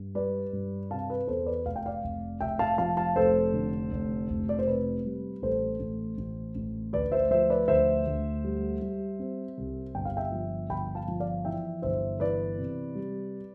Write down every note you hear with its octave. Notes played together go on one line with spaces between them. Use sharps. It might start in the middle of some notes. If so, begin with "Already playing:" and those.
Already playing: G2
G3 B4 D5
G2
C3 F5 A5
B4
E2 A4 C5
B4 D5
F1 F5
G5
D5 F5
F1
F1 E5 G5
F5 A5
F3 F5 A5
F5 A5
F1 A4 C5
D3
F1
F1
D5
C5
C3 B4
G3
A1 A4 C5
A1
A1
A1
D2 B4 D5
C5 E5
F3 C5 E5
B4 D5
D2 C5 E5
D2
G3
G3
C4
C2
G1 G5
F5
E5 G5
F3
G1 G5 B5
F5 A5
F3
D5 F5
E3 E5 G5
G1 C5 E5
E3 B4 D5
C3
G3